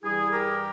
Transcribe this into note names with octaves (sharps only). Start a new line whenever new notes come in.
G2 E3 G3 E4 G#4
G4 A#4